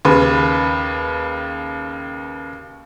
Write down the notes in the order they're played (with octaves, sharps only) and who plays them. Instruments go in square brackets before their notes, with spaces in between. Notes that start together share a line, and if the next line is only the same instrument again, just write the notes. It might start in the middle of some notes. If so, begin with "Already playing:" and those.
[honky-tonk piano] D#2 C#3 B4